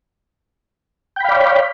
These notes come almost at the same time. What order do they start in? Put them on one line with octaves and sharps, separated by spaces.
G5 B5 F5 D5 C#5